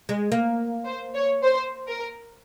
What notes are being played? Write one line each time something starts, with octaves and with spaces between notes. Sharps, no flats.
G#3
A#3
C5
C#5
C5
A#4